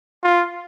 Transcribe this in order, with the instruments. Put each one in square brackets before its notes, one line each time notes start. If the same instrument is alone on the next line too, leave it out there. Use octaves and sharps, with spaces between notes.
[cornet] F4